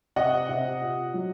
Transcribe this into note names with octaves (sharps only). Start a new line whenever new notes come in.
C3 D#5 F#5
C3
A#2
F#3